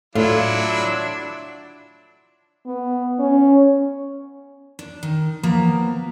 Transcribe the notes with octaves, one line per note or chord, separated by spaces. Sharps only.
A2 F#3 D4 E4 F4
B3
C#4
D4
D#3
F3 A#3 B3 A#5